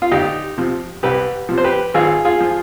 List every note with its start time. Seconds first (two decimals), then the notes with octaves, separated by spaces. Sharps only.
0.02 F4
0.11 D2 D#4 G4
0.58 C3 F3
1.03 C2 G4 B4
1.49 C3 F3
1.58 C5
1.64 G4 B4
1.94 G#1 F4 G#4
2.25 F4 G#4
2.41 F3